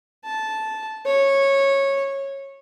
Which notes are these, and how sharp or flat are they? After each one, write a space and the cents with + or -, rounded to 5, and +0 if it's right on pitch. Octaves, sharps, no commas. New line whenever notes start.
A5 -10
C#5 -15